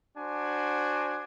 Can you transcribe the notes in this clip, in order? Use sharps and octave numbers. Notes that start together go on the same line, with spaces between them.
D4 F#4 C5 G#5